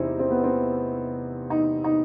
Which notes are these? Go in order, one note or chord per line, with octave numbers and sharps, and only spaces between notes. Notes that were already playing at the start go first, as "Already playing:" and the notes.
Already playing: E2 C3 C4 D#4 E4
C4
B3
C4
D#4
D#4